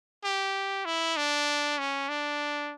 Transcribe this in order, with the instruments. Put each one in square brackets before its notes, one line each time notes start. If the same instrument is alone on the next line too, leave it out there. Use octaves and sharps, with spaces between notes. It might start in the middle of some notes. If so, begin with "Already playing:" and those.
[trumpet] G4
E4
D4
C#4
D4